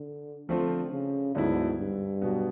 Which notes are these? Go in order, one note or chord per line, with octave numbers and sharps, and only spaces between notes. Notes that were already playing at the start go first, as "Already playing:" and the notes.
Already playing: D3
D3 F3 A3 C4 F4
C#3
D2 G#2 D3 F#3 B3 E4
G2
B2 F#3 B3